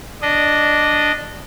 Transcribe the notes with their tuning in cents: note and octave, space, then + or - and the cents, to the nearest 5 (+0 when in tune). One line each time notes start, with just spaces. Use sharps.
D4 +0 D#5 -15